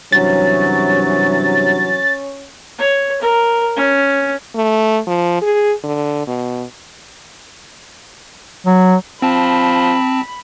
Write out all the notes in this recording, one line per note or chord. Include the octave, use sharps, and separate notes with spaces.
G2 C3 E3 F#3 C#4 A6
C#5
A#4
C#4
A3
F3
G#4
D3
B2
F#3
F3 C4 A5 B5